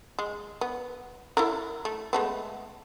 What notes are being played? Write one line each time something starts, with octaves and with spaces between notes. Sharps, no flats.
G#3
B3
E4 A4 A#4
A3
G#3 A3 B3